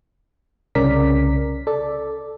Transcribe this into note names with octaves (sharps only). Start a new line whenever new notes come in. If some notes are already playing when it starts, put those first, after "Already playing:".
C2 C#3 C#4 A#4 D5 B6
A4 D5